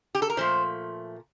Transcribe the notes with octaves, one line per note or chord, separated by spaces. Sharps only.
G4
A4
A#4
A#2 F3 A3 C5